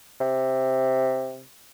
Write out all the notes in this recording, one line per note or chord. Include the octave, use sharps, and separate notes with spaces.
C3